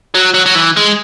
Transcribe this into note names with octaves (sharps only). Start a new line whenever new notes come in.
F#3
F#3
F#3
E3
G#3